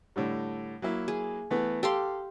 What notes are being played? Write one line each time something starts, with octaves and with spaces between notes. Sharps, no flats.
A2 D3 G3
F#3 A#3 E4
G#4
E3 A3 B3
G4 A4 F5 C6